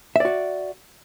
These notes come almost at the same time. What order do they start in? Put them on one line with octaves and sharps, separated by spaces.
E5 D5 F#4